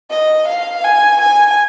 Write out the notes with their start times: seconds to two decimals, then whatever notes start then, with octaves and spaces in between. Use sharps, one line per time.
0.11 D#5
0.48 F5
0.84 G#5
1.22 G#5